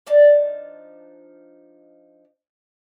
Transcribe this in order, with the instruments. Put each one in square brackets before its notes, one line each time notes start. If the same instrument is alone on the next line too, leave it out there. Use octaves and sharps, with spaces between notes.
[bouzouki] F3 D4 D#4 A5